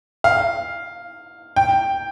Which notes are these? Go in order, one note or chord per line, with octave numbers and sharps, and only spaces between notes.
F5
G5